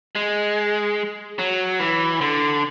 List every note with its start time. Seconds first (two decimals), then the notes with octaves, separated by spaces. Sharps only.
0.15 G#3
1.39 F#3
1.80 E3
2.21 D3